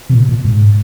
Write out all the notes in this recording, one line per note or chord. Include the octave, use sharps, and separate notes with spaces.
C3
A#2
A#2
G#2